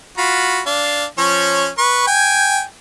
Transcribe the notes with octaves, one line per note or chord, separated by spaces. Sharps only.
F4 F#4 B5
D4 F5
F3 C#4 C#5
B4 C#6
G5 G#5